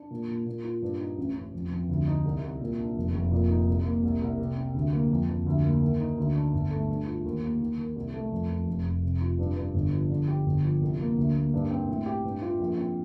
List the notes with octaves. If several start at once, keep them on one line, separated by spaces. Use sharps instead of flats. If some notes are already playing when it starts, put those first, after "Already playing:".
Already playing: D4
A#2
A#2
A#2
F4
G2
D#4
A1
A1
F2
F2
D2
D#4
C2
C2
A#2
D4
F1
F1
A#2
D#4
C2
A#3
C2
C2
C3
C4
D2
A#3
F2
F2
D2
A#3
D#3
D#4
D2
D4
G1
A3
G2
F4
D#2
A#3
D#3
D#3
C2
A3
F2
F2
F1
F1
C3
F4
G2
G2
G1
F3
D3
G4
G1
F3
C2
A#3
D2
A#3
G2
C4
A2
G4
G2
F4
A#1
C4